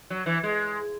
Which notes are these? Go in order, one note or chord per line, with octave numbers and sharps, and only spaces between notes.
F#3
E3
G#3